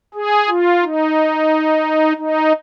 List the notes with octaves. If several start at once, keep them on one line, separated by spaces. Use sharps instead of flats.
G#4
F4
D#4
D#4